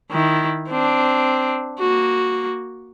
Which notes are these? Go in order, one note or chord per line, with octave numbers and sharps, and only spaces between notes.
D#3 E4
C4 D4
A#3 F#4